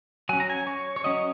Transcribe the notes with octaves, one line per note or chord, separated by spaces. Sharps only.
F#3 C#4 G#5
A#5
G#5
C#5
C#5
F#3 C#4 D#5